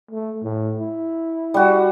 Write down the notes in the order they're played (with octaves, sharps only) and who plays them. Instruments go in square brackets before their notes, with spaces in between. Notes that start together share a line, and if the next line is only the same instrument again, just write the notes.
[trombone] A3
A2
E4
[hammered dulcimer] G3 F#4